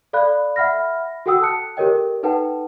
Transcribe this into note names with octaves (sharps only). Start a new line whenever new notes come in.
A4 D5 F5 B5 F#6
E5 F#5 B5 F6 A#6
F#4 A4 F#5 G5 D#6 E6
A5 F#6 C#7
G4 A4 A#4 C#5 D#5 G5
D#4 A4 B4 F#5 G5 A5